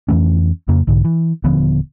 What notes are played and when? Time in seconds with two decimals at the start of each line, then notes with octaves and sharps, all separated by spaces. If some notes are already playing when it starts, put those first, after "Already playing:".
0.08 F2 E3 A3 C#4
0.68 F2 C#3 A#3
0.87 B1 G#2 D3
1.05 E3
1.44 D#1 D3 F3 B3